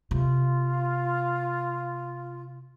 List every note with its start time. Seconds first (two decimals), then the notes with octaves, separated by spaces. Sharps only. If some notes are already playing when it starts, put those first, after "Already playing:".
0.11 C3 F4